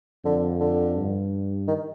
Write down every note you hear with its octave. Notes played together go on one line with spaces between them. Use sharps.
F2 D3
D3
G2
D#3